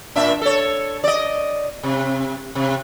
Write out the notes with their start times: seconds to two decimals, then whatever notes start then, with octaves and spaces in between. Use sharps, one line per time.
0.16 A#2 D4 E5
0.42 A4 C#5
1.04 D5 D#5
1.83 C3
2.55 C3